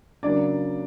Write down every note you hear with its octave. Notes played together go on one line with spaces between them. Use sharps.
C#3 F#3 A#3 D4 D5